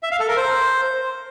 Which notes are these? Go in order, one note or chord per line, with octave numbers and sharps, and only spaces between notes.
E5
F5
A4
A#4
C5